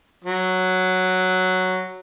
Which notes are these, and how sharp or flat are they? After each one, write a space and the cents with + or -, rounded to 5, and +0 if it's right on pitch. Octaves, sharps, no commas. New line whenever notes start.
F#3 +0